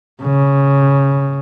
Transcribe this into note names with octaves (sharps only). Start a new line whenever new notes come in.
C#3